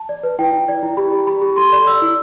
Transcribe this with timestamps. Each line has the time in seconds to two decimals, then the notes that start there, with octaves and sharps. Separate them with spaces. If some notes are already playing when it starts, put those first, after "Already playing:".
Already playing: A5
0.09 D5
0.23 B4
0.39 E4 G5
0.53 E4
0.68 D5
0.83 E4
0.97 G4 B5
1.12 G4
1.27 G4 B5
1.42 G4
1.56 A4 C6
1.72 D5
1.86 D5 E6
2.02 E4